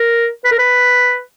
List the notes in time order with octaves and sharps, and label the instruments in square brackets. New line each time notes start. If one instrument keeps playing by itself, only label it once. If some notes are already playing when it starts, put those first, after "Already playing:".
Already playing: [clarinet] A#4
B4
A#4
B4